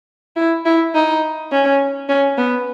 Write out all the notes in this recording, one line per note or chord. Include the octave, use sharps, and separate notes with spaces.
E4
E4
D#4
C#4
C#4
B3